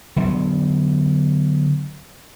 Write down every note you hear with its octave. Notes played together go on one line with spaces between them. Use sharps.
D3 F#3 B3